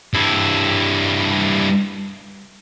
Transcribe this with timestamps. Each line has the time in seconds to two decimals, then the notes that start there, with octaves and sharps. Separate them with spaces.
0.13 G2 E4